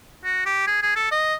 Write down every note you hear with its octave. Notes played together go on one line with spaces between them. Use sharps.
F#4
G4
G#4
G#4
A4
D#5